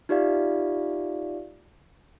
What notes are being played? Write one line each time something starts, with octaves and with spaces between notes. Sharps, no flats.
D#4 F4 G4 D5 E5 F5